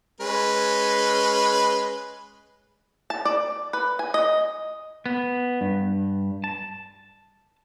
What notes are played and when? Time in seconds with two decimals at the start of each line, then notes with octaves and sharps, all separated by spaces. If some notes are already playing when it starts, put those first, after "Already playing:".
0.20 G#3 C#4 B4
3.10 A5
3.25 D5
3.73 B4
3.99 G#5
4.14 D#5
5.06 B3
5.61 G2
6.44 A5